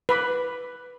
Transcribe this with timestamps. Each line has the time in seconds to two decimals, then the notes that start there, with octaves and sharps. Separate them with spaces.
0.09 B4 B5 D6